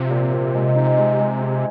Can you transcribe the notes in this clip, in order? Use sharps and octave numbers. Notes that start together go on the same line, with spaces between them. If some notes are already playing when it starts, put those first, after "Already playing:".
Already playing: C3 F3
A#2
A#2
G#3
D#4
G#3
G#3
G#4